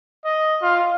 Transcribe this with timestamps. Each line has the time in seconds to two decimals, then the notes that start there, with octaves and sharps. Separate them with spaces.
0.25 D#5
0.62 F4